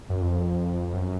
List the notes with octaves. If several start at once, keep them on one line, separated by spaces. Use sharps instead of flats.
F#2
F2
F#2